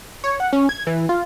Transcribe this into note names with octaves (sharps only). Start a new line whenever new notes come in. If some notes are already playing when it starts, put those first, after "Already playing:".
C#5
F#5
C#4
G#6
E3
F4